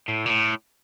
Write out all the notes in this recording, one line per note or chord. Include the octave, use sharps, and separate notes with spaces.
A2
A#2
A2